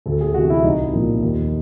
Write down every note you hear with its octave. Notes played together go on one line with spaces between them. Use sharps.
D2 A4
G#4
C3 E3 F#4
E4
C2 D#4
A#2 F3 A#3
D#2